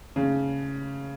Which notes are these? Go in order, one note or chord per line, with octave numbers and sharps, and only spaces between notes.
C#3